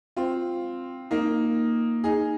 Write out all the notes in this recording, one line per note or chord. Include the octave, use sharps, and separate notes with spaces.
C4 F4
A#3 D#4
D#4 G#4